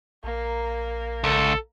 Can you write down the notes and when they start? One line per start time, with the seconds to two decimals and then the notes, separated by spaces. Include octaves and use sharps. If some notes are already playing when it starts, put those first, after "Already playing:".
0.24 A#1 A#3 A#4
1.24 C#2 A4